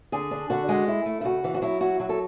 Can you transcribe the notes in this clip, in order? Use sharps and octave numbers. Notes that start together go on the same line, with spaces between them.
D3 G#4
D4
D3 F#4
G#3
E4
A3
E4
C#3 F#4
E3
F#4
F#3 E4
E4 F#4
F#3 F#4
A4